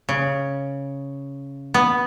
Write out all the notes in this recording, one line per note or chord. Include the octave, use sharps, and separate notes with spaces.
C#3
B3